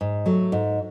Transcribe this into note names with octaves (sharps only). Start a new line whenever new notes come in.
G#2
F#3 A3
G#2